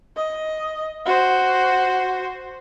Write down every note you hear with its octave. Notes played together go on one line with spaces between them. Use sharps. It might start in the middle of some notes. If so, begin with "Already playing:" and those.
D#5
F#4 C5